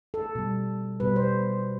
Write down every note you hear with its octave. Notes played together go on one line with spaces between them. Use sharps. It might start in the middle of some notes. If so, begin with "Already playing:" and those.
A4
B2 G3
B2 G3 B4
C5